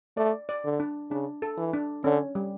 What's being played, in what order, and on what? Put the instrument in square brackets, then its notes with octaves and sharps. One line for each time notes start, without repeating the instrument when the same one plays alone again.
[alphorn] A3 [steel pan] D5
[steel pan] D5
[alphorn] D3
[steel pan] D4
[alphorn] C#3 [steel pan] D4
[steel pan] A4
[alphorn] E3
[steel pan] D4
[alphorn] D3 [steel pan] C#4
[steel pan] G3